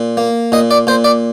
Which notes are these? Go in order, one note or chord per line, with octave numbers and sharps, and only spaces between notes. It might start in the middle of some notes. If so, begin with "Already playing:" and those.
Already playing: A#2
A#3
A#2 D#5
D5
A#2 C5
D5